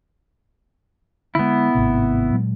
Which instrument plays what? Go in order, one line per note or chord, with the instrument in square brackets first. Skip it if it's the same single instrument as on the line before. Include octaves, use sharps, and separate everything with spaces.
[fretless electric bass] D3 G#3 [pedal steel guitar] B3 E4
[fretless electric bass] G#1 A2 C3
A#2 F#3 G#3